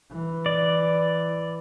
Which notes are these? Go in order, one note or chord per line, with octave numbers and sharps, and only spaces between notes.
E3
D5